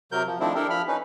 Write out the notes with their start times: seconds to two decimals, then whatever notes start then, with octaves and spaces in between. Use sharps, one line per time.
0.12 C3 F#3 A#4 G6
0.26 F3
0.40 D#3 F3 A3 C4 D4 E4
0.55 D4 E4 G4 A4 A#4
0.70 F3 B5 F6
0.88 C#4 D#4 B4